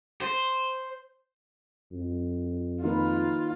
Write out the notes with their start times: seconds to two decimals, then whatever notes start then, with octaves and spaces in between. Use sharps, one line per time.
0.21 C5
1.92 F2
2.84 D#3 A#3 D#4 F4 B4